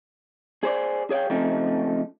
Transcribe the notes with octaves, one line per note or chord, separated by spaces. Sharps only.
G#4 C5 D5
G#4 C#5 D5 F5 G5
C#3 F3 A3 C4 D#4